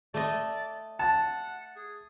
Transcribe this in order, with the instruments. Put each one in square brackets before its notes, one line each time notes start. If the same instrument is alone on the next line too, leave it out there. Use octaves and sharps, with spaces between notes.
[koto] A3 D#5 [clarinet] D5
[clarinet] F#5 [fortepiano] A5
[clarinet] G#4